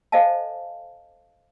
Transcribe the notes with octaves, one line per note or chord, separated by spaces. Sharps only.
A4 C5 D#5 F5 G#5 A5